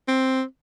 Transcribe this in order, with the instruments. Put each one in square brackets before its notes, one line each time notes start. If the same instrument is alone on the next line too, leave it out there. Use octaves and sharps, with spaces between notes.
[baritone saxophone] C4